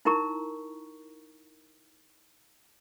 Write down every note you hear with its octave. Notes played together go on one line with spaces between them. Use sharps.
D#4 E4 A#4 A#5 C#6